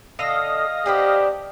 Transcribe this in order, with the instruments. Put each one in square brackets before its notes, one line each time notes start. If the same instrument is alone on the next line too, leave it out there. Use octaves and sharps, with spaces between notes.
[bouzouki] D3 A4 [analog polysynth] D#5 F5 A#6
[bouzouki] B3 C4 D4 [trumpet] G4